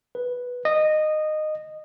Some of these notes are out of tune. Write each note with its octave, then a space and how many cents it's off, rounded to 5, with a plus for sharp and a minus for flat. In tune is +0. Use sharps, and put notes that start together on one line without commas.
B4 -5
D#5 -15